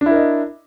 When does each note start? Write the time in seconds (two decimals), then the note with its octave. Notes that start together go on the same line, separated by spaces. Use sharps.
0.01 D4
0.06 E4
0.11 A#4
0.16 D#5